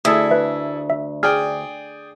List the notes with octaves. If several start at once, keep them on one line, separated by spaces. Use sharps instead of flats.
D2 E4 G#4 A4 D#6
B4 E5
E5
G#4 D5 G5 F6